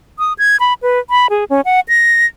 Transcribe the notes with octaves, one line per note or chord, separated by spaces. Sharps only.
D#6
G#6
B5
B4
B5
G#4
C#4
F#5
A#6